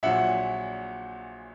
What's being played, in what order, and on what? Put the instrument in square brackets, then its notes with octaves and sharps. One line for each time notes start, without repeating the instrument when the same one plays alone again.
[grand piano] A#1 A#2 F#3 E5 F#5